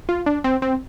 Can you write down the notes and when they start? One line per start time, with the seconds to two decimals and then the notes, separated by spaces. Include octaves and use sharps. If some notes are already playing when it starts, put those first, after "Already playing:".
0.09 F4
0.26 D4
0.44 C4
0.62 C4